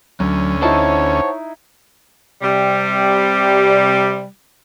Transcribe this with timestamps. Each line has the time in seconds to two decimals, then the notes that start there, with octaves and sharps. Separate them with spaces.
0.20 D2 F#3 C#4
0.62 D#4 E4 C5 C#5 F#5 A5
2.42 C3 G3